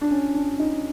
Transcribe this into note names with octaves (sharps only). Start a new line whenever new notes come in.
D4
C#4
D4
D#4